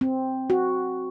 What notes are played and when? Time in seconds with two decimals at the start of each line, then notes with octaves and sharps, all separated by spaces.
0.01 C4
0.50 F#4